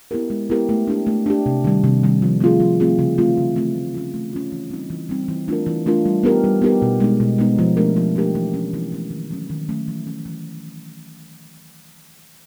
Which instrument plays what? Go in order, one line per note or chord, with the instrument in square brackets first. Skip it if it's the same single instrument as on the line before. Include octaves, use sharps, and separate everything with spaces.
[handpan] B3 E4 G4 A#4
G#3
B3 E4 G4 A#4
A3
D4 G4
A3
D4 G4
C3
D#3 G3
C3
D#3 G3
F3
A3 C4 F4 G#4
F3
A3 C4 F4 G#4
C#3
E3 A3 C4 F4
C#3
E3 A3 C4 F4
A3
C#4 F4
A3
C#4 F4
E3
G3 C4 D#4
E3
G3 C4 D#4
E3
A3 D4 F4 A#4
E3
A3 D4 F4 A#4
G3
B3 D#4 G4 A#4
G3
B3 D#4 G4 A#4
B2
G#3 B3 D#4
B2
G#3 B3 D#4
F3
A3 D4 G4 A#4
F3
A3 D4 G4 A#4
E3
A3 C#4
E3
A3 C#4
D#3
F#3 A3 C#4
D#3
F#3 A3 C#4
E3
A3 C#4
E3